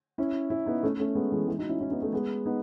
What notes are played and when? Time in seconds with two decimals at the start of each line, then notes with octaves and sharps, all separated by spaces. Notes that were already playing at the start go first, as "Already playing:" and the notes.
0.18 C#4 E4
0.50 C#4 E4
0.66 B3 D#4
0.83 A3 C#4
0.99 A3 C#4
1.15 G#3 B3
1.32 E3 G#3
1.48 E3 G#3
1.59 D#4 F#4
1.69 C#4 E4
1.81 C#4 E4
1.91 B3 D#4
2.02 A3 C#4
2.13 G#3 B3
2.46 B3 D#4